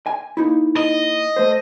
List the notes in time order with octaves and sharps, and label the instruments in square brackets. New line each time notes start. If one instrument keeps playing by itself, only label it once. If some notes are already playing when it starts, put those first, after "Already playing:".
[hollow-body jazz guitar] G#5
A#3 D#4 E4
[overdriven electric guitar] D#5
[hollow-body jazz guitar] A3 C5